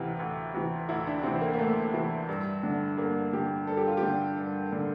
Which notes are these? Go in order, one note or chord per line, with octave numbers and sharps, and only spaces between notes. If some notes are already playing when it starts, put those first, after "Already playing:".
Already playing: D2 C3 E3 F4
D2
C3 E3
D2 E4
D4
C3 E3 C4
A#3
A#3
D2 A3
C3 E3
G2
D3
G2 A#3
D3 G4
G2 A4
G4
F4
G4
D3
G2
D3